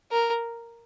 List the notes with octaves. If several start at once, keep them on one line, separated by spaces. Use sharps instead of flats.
A#4